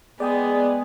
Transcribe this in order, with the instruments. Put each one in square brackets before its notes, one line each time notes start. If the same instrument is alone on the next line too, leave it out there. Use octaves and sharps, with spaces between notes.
[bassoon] G#3 [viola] B3 [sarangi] G#4 [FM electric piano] D5 G5 D#6